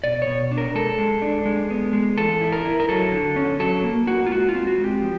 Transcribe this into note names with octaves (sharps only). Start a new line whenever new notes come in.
B2 D5
C#5
B2
D4
A#4
G#3 A4
G#3
D4
G#3
B3
G#3
E3 A4
E4
A#4
E4
A#4
F#3 A4
D3
C#4
F#3 A4
A#3
A#3 F#4
F4
G#3 F#4
F4
C4
F#4
G#3
G4
F3